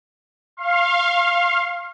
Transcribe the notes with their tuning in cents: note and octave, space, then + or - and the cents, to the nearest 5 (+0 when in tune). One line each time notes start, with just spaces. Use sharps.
F5 -5 C6 +45